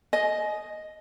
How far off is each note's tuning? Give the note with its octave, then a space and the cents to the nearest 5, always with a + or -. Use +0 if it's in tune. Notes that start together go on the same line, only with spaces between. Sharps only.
D#5 +0 G#5 +30